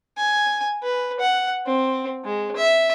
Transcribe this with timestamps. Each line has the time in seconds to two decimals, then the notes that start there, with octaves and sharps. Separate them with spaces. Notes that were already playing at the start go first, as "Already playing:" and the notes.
0.17 G#5
0.83 B4
1.20 F#5
1.66 C4
2.25 G#3
2.56 E5